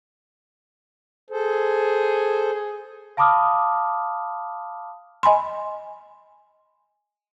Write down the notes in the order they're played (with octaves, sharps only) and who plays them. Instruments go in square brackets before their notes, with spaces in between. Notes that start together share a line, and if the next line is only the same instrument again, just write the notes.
[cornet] G#4 [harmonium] A4 C5
[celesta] F5 A5 B5 D6 D#6 F6
[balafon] D#5 G#5 B5 C6